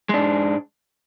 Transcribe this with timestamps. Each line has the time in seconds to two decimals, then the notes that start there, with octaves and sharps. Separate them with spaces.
0.09 G#3
0.14 D4
0.18 G#2